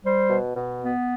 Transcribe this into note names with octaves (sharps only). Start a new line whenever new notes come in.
G3 C5
B2
B2
B3